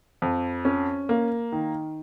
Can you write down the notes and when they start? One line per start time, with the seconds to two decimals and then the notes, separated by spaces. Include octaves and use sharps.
0.22 F2
0.65 C#4
1.09 A#3
1.52 D#3